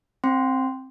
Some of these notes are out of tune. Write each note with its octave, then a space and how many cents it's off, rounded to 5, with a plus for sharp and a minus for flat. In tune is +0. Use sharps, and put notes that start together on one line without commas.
C4 +10 G5 +0 C6 -10